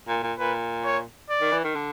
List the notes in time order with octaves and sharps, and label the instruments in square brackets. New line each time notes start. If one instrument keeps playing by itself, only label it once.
[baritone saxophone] A#2
A#2
[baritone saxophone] A#2 [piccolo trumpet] B4
[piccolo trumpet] C#5
D5
[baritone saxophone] D#3
E3
D#3
D3